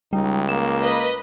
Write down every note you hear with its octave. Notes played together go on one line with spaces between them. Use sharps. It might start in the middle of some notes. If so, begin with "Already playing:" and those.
C#2 G3 D#4
A#3 E7
B4 D#5